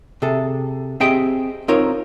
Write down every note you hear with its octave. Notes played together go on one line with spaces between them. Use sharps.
C3 G#4 A4
C4 G4 G#4 D#5 E5 G5
C4 D#4 F4 A#4 C#5